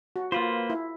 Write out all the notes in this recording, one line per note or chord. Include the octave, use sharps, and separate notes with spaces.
F#4
A#3 F4 B4 C5
E4